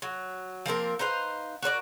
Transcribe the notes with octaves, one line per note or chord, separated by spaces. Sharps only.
F#3
F3 A#3 C4 A#4
D#4 B4 C5 F5
F#4 A#4 C#5 D5